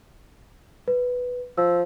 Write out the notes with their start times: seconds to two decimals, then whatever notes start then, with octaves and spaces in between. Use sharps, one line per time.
0.88 B4
1.58 F3 E6